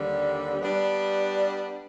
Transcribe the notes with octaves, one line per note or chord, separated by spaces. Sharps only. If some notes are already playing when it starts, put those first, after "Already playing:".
Already playing: D#2 D3 G3
G3 B3 D4